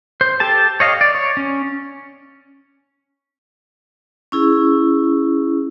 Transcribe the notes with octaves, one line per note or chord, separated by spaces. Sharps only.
C5
G4 A4 A5
C#5 D#5 F5
D5
C#5
C#4
C#4 E4 G#4